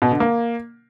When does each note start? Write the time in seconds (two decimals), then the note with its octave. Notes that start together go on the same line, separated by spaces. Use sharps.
0.02 B2
0.11 D3
0.20 A#3